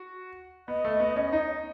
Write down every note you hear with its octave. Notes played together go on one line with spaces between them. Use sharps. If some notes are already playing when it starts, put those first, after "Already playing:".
Already playing: F#4
B3 D#5
A3
B3
C#4
D#4